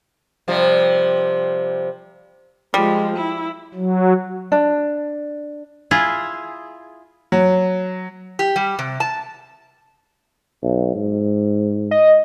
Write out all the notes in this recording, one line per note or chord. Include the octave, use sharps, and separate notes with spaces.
C3 F3 G3
F3 G3 G#3
E4
F#3
D4
E4 F4 G#4
F#3
G4
G3
C3
A5
B1
G#2
D#5